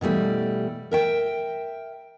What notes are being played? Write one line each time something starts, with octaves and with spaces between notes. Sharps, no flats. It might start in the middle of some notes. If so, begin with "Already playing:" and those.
B2 E3 G3 A3
A#4 E5 G5